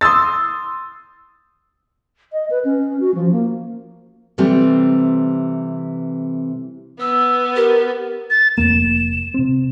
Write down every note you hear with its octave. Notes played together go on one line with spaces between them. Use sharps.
C6 D#6 E6 A6
D#5
B4
C#4
F#4
F3
A#3
C3 E3 G3 A3 C4
B3 E6
G4 A#4
A6
F1 F2 A#3 E7
C3 C4